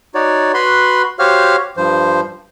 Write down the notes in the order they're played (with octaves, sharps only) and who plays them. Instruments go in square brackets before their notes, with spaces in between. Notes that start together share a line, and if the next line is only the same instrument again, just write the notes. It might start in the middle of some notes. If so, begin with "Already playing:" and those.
[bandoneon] D#4 F#4 C#5 D5
F#4 B4 B5 C6
F#4 G4 C5 C#5 F5 F6
G2 F3 C5